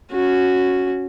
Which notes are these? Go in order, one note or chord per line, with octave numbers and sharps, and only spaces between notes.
C#4 F#4